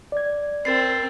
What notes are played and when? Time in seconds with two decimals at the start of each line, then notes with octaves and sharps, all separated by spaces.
0.12 D5 G#6
0.65 C4 A#4 A6 C7